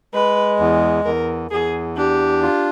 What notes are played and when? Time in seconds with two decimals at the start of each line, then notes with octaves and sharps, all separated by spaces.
0.14 G#3 B4
0.59 E2
1.05 E2 A#4
1.51 E2 G#4
1.97 D4 G4
2.42 F4